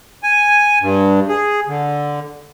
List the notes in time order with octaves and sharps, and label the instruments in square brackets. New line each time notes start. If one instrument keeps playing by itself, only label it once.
[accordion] G#5
G2
G#4
D3